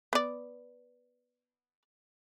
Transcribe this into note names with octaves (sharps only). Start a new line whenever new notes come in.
B3 D5